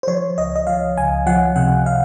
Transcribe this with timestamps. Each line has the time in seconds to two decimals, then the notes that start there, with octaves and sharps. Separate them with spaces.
0.03 C5
0.08 F3 C#5
0.38 C#2 D#5
0.56 D#5
0.67 F3 F5
0.98 C#2 G#5
1.26 F3 F#5
1.56 C3 F#5
1.86 F5